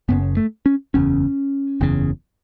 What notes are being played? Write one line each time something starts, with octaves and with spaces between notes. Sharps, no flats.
F#1 F#2 C#3 B3
A3
C#4
F#1 E2 C#3 C#4
F#1 E2 C#3